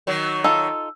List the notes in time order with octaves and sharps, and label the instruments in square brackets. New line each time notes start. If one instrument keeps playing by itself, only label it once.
[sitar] D#3 F#3
[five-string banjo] D#4 F4 A4 [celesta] E6